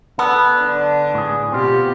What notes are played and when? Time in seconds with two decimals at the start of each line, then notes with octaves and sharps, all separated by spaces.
0.19 B3 A4
0.55 D3 D4
1.14 A2 G#4
1.52 B2 C4 F4 G4